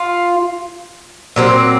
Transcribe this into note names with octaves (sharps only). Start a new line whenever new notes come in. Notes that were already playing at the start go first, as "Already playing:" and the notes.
Already playing: F4
A#2 F#3 C4